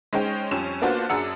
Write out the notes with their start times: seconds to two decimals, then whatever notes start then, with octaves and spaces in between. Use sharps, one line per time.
0.13 G#3 C#4 D#4 C5 G5
0.51 F2 G3 C#4 E7
0.81 A#3 B3 D4 F4 F#4 C5
1.09 F#2 D4 G#4 F#5 E6 C#7